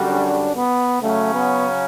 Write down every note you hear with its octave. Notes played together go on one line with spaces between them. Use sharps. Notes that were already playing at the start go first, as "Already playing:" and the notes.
Already playing: F#2 D3 G3 C#4 F#4
D4
B3
C#3 F#3 A3 C#4
B3